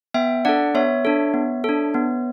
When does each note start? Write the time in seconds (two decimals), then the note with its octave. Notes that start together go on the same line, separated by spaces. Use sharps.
0.14 B3 E5 G5
0.45 D4 A4 D5 F#5
0.74 B3 C#5 E5
1.05 D4 A4
1.34 B3
1.64 D4 A4
1.94 B3